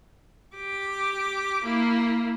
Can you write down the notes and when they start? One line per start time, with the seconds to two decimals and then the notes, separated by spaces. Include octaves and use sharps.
0.56 G4 D6
1.64 A#3 E4